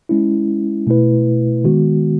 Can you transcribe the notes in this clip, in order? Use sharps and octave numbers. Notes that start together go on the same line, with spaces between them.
G#3 C#4 E4
B2 A3 E4 B4
D#3 G#3 B3 F#4